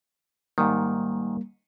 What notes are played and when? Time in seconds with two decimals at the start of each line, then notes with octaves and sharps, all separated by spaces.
0.58 G#2 D#3 G3 A#3